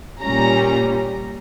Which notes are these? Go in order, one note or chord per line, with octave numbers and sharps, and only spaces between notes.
A#2 G3 C#4 A#5